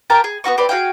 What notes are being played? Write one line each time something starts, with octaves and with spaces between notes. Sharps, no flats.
G4 A#4 G5 A5
G#4
B3 F4 F#4 C#6
C4 G4 B4 D5
F#4 G#4 F5 G5